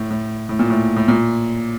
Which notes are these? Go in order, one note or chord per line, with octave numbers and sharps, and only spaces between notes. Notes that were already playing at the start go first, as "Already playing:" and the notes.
Already playing: A2
A2
A2
A#2
A2
A2
A#2